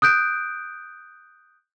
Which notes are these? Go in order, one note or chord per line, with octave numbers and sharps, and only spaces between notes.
D#6 F#6 G6 D7